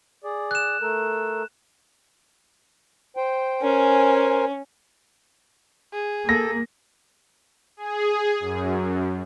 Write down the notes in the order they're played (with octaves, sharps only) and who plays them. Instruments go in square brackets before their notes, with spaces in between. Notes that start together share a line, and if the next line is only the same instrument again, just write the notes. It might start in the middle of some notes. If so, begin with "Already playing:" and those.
[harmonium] G#4 D5
[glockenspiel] F#6 E7
[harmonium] A3 A4 A#4
C5 G5
[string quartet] C#4 [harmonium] A#4 C5 G#5
[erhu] G#4
[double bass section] A#3 [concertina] A4 [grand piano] A#6
[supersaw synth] G#4
F#2